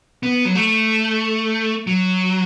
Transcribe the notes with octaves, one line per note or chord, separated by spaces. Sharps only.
B3
F#3
A3
F#3